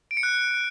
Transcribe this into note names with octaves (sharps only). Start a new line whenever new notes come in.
D7
C#7
F#6